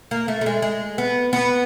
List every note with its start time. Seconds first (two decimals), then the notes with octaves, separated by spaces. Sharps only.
0.11 A#3
0.28 A3
0.41 A3
0.46 G#3
0.62 G#3
0.98 B3
1.33 B3